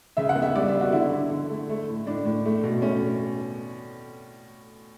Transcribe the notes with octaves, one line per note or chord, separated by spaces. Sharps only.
C#3 E5
F#5
B3
E5
G3 D5
E5
B3
F#4
D3 E4
D3
D3
A3
A3
A2
A2 D4
A2
A3
B2
A3 C#4